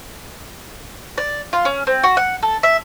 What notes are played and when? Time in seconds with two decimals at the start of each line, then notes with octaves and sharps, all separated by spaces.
1.18 D5
1.53 F4
1.65 C#4
1.87 C4
2.04 F#4
2.17 F#5
2.43 A4
2.63 E5